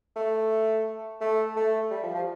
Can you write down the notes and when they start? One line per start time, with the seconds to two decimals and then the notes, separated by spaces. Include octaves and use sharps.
0.16 A3
1.21 A3
1.56 A3
1.91 G3
2.03 F3
2.15 F3